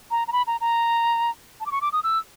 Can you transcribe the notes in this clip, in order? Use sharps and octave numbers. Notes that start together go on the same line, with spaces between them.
A#5
A#5
B5
A#5
A#5
A5
D6
C#6
D6
D#6
E6